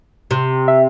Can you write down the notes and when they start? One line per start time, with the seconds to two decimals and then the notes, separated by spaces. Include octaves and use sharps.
0.31 C3
0.68 E5